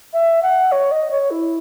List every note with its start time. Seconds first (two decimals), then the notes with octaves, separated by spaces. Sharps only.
0.14 E5
0.43 F#5
0.72 C#5
0.91 D#5
1.11 C#5
1.31 E4